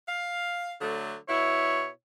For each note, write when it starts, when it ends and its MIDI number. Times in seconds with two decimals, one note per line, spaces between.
0.08 0.74 77
0.81 1.16 50
0.81 1.16 54
0.81 1.16 57
1.29 1.89 47
1.29 1.89 64
1.29 1.88 73